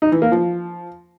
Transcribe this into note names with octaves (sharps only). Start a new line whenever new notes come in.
D#4
E3
A#3
F3